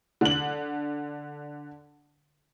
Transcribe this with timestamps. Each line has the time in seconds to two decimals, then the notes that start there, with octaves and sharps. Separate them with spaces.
0.21 D3 F#7